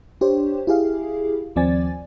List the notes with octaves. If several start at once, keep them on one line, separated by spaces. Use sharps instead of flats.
D4 G4 C5 C#5
E4 G4 G#4 F5
D#2 F3 C4 D5 G#5 A6